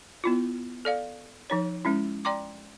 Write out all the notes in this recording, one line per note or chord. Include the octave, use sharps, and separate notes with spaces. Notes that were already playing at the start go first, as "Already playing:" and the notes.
B3 E4 F4
A4 D5 F5
F3 D#4 C#5
G#3 C#4 E4
D5 G5 A#5 C6 D6